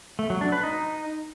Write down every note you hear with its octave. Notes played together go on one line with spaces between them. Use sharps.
A3
F#3
D4
B4
D#4